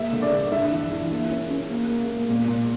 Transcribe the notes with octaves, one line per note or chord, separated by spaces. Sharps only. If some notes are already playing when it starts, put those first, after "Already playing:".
Already playing: A#3 E5
D3
D5
D3
G2 E5
E3
E3
A#3
C#4
C#4
A#3
A#3
A#3
A#2
A#2